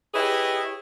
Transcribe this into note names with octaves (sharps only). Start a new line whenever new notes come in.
E4 G4 G#4 B4 C#5 D#5